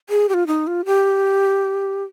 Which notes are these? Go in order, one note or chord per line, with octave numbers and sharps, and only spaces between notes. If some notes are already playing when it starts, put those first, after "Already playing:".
G#4
G4
F4
D#4
F4
G4